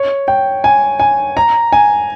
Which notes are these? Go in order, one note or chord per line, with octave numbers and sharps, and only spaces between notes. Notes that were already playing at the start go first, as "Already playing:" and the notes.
Already playing: C#5
G5
G#5
G#5
A#5
G#5